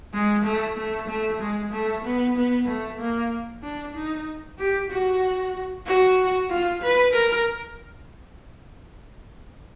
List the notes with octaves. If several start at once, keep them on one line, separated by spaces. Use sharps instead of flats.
G#3
A3
A3
A3
G#3
A3
B3
B3
A3
A#3
D4
D#4
G4
F#4
F#4
F4
B4
A#4